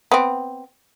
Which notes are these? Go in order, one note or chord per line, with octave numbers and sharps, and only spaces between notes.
B3 C4